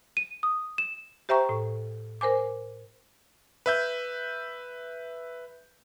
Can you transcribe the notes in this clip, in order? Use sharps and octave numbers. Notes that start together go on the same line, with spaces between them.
D#7
D#6
E7
G4 C5 E5 G5 A#5 C#6
A2
A#4 C5 G#5 D6
B4 E5 G6